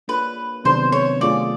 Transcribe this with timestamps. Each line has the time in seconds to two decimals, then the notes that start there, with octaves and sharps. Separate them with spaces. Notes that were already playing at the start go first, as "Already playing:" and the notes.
0.08 A#3 D4 F4 G#4 B4 C#5
0.64 C3 D#3 F#3 B3 D4 C5
0.92 C#5
1.21 A3 D4 F4 G#4 D5